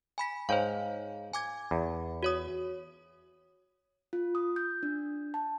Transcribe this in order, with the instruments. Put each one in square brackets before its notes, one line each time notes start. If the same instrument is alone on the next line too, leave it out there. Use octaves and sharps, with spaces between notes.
[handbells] G#5 B5 B6
[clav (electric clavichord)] G#2 G5 [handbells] C5 C#5 F5
[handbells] G#5 D6 G#6
[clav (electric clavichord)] E2
[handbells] F#4 C#5 D#6
[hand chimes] F4
D#6
G6
D4
A5